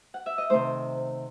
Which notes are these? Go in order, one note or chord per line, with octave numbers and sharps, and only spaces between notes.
F#5
E5
D#5
C3 D#3 A3 D#4 C5